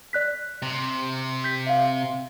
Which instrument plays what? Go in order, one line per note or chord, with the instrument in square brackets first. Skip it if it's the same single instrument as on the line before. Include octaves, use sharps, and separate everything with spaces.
[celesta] D5 F#6 B6
[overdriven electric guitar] C3
[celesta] G6 B6
E5 F5